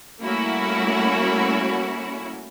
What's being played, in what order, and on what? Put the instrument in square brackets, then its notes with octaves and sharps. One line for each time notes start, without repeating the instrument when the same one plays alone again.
[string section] G3 A3 A#3 C#4 E4 F#4